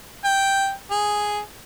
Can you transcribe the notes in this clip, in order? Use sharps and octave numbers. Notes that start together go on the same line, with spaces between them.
G5
G#4